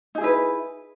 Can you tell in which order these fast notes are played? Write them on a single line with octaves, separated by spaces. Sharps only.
D#4 G#4 E4 B4